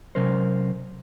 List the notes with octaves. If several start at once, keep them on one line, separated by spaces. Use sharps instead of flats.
C3 F#3 C#4 A#4 C5